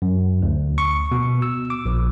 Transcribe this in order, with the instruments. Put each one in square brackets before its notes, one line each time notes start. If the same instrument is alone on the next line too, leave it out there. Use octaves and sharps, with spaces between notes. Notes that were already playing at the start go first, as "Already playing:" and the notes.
[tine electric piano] F#2
D2
C#6
B2
E6
D6
A#1